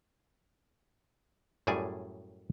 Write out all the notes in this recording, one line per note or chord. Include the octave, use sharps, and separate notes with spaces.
F#2 A2 G3 G#4 D5 G#5